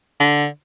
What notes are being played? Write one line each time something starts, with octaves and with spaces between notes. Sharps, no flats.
D3